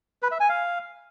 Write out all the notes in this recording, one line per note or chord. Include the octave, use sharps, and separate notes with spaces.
B4
E5
G#5
F5